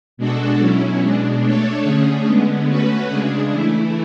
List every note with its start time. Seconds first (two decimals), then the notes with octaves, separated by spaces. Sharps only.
0.17 B2 G#3 D4 F#4 A4
0.59 B2 F#3 C#4 E4
1.00 B2 G#3 D4
1.42 A3 D4 A4 C#5
1.83 D3 A3 C#4 G#4
2.26 D3 G#3 B3
2.67 A3 C#4 F#4 B4
3.09 C#3 G#3 D4 G#4
3.51 E3 A3 E4